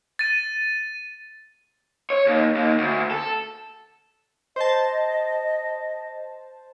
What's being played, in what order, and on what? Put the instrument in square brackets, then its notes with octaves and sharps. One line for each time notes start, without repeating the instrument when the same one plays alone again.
[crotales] A6 D#7
[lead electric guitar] C#5
D#2
D#2
D2
A4
[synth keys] C5 A5 [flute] D#5